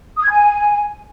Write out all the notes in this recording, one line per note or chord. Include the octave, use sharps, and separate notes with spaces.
D#6
G#6
G#5